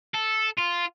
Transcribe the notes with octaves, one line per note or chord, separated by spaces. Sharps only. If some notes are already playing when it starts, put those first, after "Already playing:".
A4
F4